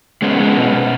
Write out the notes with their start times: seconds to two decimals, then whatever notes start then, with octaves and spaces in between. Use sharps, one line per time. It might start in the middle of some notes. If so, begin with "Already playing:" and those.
0.22 G#3 B3 C#4
0.40 G#3
0.57 B2
0.73 B2